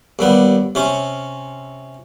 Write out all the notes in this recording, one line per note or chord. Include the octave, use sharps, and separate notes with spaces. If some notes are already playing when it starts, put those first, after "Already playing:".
D#2 G3 B3
C3 C#4